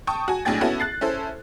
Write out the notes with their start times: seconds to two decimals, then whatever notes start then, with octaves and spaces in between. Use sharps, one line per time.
0.07 G5 A5 C#6 D#6
0.28 F#4 G#5
0.45 B1 A2 D4 G#4 G5 A6
0.61 B3 C#4 E4 F#4 A4
0.80 F#6 A6 C7
1.01 C#4 E4 A4 C5